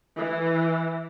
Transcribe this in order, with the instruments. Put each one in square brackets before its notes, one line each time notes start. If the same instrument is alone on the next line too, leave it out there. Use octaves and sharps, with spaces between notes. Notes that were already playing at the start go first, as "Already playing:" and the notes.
[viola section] E3